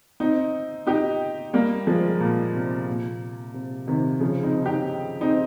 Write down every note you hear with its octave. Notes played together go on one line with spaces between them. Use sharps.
C4 D#4
D#4 G4
G3 A#3
F3 G#3
A#2
C3
A#2
C3
C3 D#3
C#3 F3
C4 D#4
D#4 G4
C4 D#4